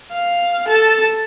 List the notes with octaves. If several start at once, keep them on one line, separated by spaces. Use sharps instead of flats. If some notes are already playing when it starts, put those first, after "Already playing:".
F5
A4 A5